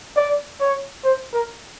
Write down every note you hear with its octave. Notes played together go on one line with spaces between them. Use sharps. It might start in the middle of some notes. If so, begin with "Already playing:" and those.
D5
C#5
C5
A#4